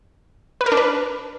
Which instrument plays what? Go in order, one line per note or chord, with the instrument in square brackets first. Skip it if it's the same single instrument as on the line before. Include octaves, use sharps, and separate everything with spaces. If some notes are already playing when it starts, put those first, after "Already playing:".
[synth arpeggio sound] B4
A#4
D4
B4